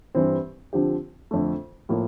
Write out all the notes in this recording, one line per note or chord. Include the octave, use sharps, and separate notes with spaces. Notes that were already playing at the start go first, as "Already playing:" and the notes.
G2 E3 G3 C4
D3 F3 C4 G4
F2 D3 A3
A2 F3 A#3